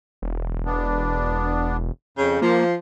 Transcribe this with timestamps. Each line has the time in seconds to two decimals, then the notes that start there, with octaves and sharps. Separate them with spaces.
0.22 E1
0.66 B3 D4
2.17 F2 C#3 G6
2.42 F3 A#3 C6